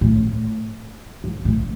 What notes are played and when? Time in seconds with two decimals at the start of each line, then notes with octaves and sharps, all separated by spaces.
0.01 A2
1.24 G#2
1.45 A2